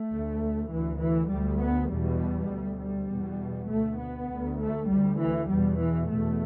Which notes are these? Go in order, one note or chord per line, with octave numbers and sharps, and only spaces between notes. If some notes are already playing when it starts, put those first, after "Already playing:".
Already playing: A3
D2
D2 E3
E3
D2 G3
B3
E2 B2 G3
D2
G3
E2 B2
D2 A3
B3
D2
A3
D2 G3
E3
E2 B2 G3
E3
E2 B2 A3